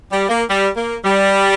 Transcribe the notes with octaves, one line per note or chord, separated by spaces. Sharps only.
G3
A#3
G3
A#3
G3